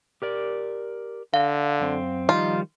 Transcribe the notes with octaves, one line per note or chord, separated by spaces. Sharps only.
G4 A#4 D5
D3 F5
F#2 C4
D#3 F3 G3 D#4 F4